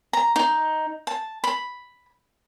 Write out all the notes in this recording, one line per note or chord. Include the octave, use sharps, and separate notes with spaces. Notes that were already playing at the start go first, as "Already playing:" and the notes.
A#5
D#4
A5
B5